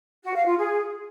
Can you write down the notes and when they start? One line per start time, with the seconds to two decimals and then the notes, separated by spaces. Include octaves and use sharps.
0.24 F#4
0.35 F5
0.46 F4
0.58 G#4